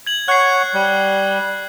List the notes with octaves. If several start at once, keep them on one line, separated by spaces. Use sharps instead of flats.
G#6 F#7
C#5 F#5 F#6 G#6 C7
G3